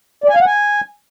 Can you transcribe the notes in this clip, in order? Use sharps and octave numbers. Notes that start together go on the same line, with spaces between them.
D5
G#5
F5
F#5
G#5